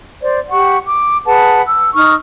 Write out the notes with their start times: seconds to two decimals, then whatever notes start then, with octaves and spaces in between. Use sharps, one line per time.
0.21 C5 D5
0.50 G4 F#5 C#6
0.86 D6
1.26 G#4 B4 F#5 A5
1.67 E6
1.95 D#4 C#6 F6